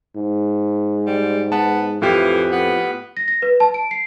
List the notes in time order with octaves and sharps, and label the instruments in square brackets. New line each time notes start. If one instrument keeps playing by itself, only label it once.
[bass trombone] G#2
[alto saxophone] G3
[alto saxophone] B3 [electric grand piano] A5
[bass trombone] F2 [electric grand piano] A2 F4 G4 [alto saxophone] E3
[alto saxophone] B3
[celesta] A#6
A#6
B4
A5
D7
C7